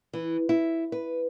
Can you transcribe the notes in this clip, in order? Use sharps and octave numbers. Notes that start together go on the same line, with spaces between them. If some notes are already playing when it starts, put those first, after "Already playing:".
E3
E4
B4